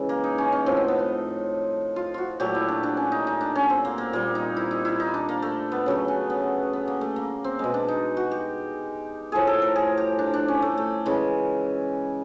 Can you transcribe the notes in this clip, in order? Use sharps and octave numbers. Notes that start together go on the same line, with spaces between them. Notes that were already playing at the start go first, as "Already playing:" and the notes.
Already playing: C#3 E3 G#3
A#3
D#4
C#4
C#4
A2 F3 A3 C4
B3
B3
C4
F4
F4 F#4
A#2 F#3 A3 G4
E4
D4
D4
C#4
D#4
D#4
D4
C#4
C4
A#3
A#3
A#2 G3 A#3
D#4
E4
D#4
E4
D#4
D4
A#3
A3
B3
C#3 F#3 A3
C#4
B3
B3
A#3
A3
A#3
C4
B2 G#3
D4
D#4
F#4
G4
A2 F3 A3 G#4
A4
A#4
G#4
G4
D4
D4
C#4
A3
A3
C#3 E3 G#3